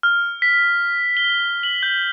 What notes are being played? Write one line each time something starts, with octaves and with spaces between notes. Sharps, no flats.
F6
B6
G7
F#7
G6